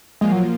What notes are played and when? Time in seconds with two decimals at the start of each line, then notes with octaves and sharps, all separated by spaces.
0.21 A#2 F3 G#3 A#3 F4
0.32 F#3